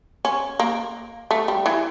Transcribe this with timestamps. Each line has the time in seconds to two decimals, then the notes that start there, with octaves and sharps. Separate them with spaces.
0.25 C#4
0.59 A#3
1.31 A3
1.48 G3
1.66 E3